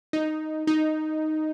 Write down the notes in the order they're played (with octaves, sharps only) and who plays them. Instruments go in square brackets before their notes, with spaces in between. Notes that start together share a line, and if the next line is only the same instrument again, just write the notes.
[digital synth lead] D#4
D#4